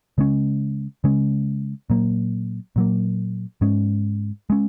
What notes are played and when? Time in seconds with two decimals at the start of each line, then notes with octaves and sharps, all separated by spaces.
0.18 C#3 G#3 C#4
1.04 C#3 G#3 C#4
1.90 A#2 F#3 A#3
2.76 A#2 F#3 A#3
3.61 G#2 G#3 C#4
4.50 G#3 C#4